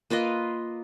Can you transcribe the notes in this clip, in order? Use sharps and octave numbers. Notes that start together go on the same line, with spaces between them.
A#3 F4 B4 D#5